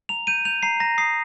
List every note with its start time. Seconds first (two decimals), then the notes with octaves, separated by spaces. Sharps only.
0.09 A#5 F7
0.27 G6 D#7
0.45 G6 F7
0.63 A#5 C7
0.80 A#5 A#6
0.98 D#6 C7